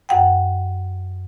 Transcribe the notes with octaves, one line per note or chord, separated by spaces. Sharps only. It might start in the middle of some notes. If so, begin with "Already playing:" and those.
F#2 F#5 G5